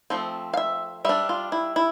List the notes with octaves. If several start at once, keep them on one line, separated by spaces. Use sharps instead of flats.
F3 A3 C4
F5
E5
G3 D4 E5
F4
E4
E4